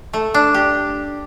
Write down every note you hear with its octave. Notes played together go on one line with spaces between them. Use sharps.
A3
D4
G4